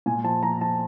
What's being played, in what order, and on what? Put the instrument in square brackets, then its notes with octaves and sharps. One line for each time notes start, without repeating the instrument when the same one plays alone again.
[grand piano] A#2 G#5
F3 A5
F3 A#5
F3 A5